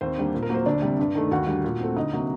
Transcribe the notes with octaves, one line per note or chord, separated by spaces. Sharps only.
D#2 C4 C5
D3 G3 A#3
A#2
A#4
F#3 A#3 C5
D2 D4 D5
C3 G3
G2
D#3 A3
D#2 F#4 F#5
D3 G3
A#2
A3 C4
D2 D#4 D#5
C3 F#3 A#3